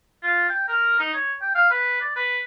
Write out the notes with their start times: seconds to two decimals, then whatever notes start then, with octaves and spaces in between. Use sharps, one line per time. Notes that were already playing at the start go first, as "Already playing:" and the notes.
0.23 F4
0.49 G5
0.68 A#4
0.99 D#4
1.14 C#5
1.41 G5
1.55 F5
1.71 B4
2.01 D5
2.16 B4